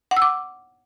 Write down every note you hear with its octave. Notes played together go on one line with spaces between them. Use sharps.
F#5
E6
D6